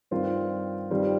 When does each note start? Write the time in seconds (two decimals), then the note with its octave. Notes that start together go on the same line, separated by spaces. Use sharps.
0.11 G2 D#3 C4 F4 A#4
0.90 G2 D#3 G3 C4 F4